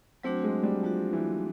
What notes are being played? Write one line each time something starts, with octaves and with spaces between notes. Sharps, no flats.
F#3 A3 C4 D4 F#4
G#3
G3
F3 F#3 A3 D4 F#4
E3